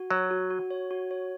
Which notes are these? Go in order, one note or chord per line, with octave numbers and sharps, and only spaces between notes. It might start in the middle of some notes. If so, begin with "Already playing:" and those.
Already playing: F#4
F#3 C#5
F#4
F#4
C#5
F#4
C#5